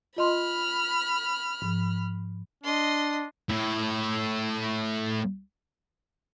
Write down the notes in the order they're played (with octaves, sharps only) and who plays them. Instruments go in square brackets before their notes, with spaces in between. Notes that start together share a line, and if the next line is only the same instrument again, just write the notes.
[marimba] F4 D#5 C6 [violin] B5 F6
[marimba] G#2 F3
[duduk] D4 [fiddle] D#5 C6
[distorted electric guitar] A2 E4